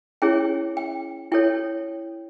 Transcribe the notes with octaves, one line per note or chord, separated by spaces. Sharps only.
C#4 E4 G#4 C#5 G5
G5
E4 A4 C#5 G5